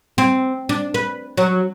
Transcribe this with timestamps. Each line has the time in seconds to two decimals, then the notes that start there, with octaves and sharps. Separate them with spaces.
0.18 C4
0.69 D4
0.94 B4
1.37 F#3